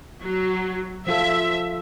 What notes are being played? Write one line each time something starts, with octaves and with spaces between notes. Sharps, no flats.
F#3
F3 F4 A4 E5